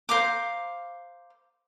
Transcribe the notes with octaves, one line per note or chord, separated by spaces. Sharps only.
C5 F5 A#5 D6